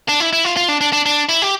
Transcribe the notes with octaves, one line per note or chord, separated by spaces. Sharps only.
D4
E4
E4
F4
F4
D4
D4
D4
D4
E4
G4